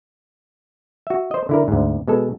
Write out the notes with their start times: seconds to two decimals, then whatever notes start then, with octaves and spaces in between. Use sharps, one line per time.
1.07 F#4 E5
1.31 C5 D#5
1.49 D3 E4 A#4
1.68 D2 G#2
2.08 B2 G#3 A4